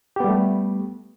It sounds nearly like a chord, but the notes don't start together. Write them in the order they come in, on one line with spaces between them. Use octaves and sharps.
G4 B3 G3 A3